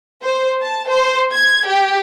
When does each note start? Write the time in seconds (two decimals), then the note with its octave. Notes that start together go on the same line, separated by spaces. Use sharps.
0.24 C5
0.61 A5
0.89 C5
1.34 G#6
1.67 G4